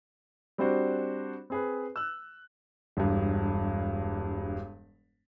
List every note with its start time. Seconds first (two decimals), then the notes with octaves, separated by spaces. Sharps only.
0.58 G3 C4 D4 F#4 C5
1.50 C4 G#4 B4
1.96 E6 F#6
2.97 E1 G2